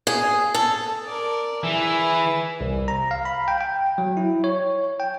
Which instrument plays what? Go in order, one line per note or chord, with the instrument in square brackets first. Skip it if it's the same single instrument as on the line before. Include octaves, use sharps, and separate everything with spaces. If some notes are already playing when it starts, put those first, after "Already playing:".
[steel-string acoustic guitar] G#4
A4
[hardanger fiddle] A#4 D5
[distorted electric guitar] E3 [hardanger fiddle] E4 G#4
[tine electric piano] C2
A#5
F5
B5
G5
G5
F#3
E4
C#5
G5